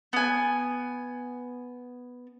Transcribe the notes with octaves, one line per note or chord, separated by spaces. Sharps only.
B3 G#5